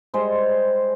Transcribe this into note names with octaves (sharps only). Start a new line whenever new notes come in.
G3 G#3 C5